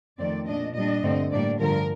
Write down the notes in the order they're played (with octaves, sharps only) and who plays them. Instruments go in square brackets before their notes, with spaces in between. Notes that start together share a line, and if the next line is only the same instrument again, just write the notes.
[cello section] F2 D#3 A3 C4 D5
A#2 A3 D4 D#5
A#2 G3 D4 D#5
G2 D3 A3 C4
A2 G3 A#3 D4 D5
G2 D3 F3 A#4